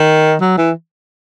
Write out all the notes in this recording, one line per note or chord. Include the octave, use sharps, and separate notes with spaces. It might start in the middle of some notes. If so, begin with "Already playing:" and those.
Already playing: D#3
F#3
E3